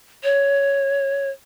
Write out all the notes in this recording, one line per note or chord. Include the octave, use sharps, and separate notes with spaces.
C#5